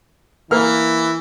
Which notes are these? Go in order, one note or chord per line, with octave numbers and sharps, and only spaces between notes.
E3 A#3 F6